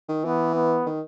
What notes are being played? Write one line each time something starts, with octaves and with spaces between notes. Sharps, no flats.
D#3
E3 B3
B3
D#3